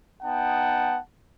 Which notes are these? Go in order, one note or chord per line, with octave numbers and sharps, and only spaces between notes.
B3 D#4 F#5 G5 A5